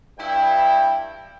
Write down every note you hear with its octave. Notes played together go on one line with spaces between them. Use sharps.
G2 E4 G5